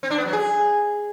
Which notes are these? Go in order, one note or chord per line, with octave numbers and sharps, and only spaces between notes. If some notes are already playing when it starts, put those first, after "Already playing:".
C4
D4
B3
F#3
G#4